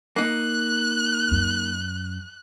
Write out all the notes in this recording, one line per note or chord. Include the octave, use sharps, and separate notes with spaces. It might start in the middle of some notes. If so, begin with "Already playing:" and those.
A#3 D#4 F#6
F#2